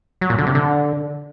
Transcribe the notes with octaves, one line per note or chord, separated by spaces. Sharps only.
F#3
A#2
D3
C3
D3